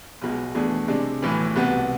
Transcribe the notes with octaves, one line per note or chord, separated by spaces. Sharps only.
B1 B2 G#3
E2 B2 A3 D4 G#4
C3 G#3 D4
B1 A2 E3
C2 B2 B3